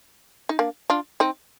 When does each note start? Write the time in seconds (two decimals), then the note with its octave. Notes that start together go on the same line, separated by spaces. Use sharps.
0.49 D#4
0.59 A#3 D4
0.90 D4 F4
1.20 C4 D#4